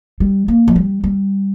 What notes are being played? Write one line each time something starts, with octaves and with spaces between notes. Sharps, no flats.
G3
A#3
F3
G3
G3